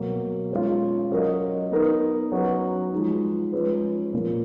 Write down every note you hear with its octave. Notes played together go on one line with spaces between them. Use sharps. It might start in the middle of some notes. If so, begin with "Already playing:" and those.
Already playing: B2 F#3 A#3
G#3 C#4 F4
F#3 C#4 F#4 A#4 D#5
B3 D#4 A#4
F#3 C#4 F#4 B4
F3 G#3 D#4
F3 G#3 C#4 G#4 B4
A#2 F3 A#3 C#4